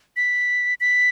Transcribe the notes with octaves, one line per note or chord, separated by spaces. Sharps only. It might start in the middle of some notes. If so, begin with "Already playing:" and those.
B6
B6